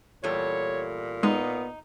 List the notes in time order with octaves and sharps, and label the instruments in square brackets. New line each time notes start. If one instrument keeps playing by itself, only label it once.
[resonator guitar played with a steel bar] E2 G3 A4 [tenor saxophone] A#2 [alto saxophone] C#5
[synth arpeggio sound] G#3 [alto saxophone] B3 [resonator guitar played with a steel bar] D#4